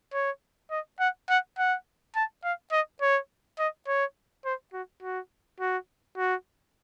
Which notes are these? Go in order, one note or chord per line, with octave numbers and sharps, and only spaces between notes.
C#5
D#5
F#5
F#5
F#5
A5
F5
D#5
C#5
D#5
C#5
C5
F#4
F#4
F#4
F#4